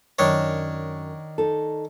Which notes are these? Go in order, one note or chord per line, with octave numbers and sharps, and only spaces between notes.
F#2 D#3 D4 C#5
D#4 A4